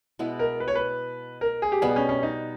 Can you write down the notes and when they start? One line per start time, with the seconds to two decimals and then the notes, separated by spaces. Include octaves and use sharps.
0.19 B2 G#3 B3 E4
0.39 A#4
0.60 B4
0.68 C#5
0.75 B4
1.41 A#4
1.62 G#4
1.72 G4
1.82 B2 G3 B3 G#4
1.96 C#4
2.09 C#4
2.23 D#4